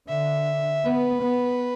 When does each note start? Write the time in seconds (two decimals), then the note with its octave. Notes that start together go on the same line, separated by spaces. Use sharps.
0.08 D3 E5
0.85 B3 B4
1.23 B3